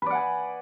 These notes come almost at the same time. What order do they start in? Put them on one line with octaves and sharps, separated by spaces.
B4 D5 F#5 G#5